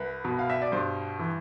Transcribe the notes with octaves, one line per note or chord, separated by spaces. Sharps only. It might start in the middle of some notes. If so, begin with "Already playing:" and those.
Already playing: C2 B4
B2
F5
E5
D5
G2 C5
E3